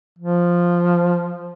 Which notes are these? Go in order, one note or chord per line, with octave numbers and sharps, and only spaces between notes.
F3